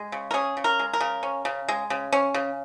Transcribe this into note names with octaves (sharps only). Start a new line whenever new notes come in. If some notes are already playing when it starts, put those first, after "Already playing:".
Already playing: G#3
C#3
A#4
C#4 G#4
C#3
A#4
G#3
A#4
C#3
C#4
C#3
G#3
C#3
C#4
C#3